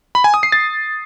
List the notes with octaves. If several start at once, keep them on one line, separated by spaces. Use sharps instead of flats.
B5
G#5
D#6
C7
A6